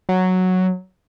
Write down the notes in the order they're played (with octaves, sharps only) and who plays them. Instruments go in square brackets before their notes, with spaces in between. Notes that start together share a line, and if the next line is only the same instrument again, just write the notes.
[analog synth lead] F#3